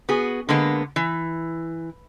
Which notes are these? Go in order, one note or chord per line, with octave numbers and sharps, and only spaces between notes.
B3 F#4 G#4
D3 G#3 A#3 B3
E3